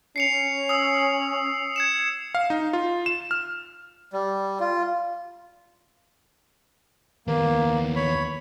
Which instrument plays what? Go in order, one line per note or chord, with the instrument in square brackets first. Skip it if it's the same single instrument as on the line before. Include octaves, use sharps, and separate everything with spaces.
[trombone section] C#4 [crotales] C7 C#7 F7
[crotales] D#6 E6
G#6 C#7 E7
[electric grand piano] F5
D#4
F4
E7
F6
[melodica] G3
F4
[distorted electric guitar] D#2 B3 [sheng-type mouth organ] A#3
[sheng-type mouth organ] C#5 B5